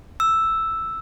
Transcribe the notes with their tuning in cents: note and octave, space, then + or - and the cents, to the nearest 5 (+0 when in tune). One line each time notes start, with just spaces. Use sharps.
E6 +0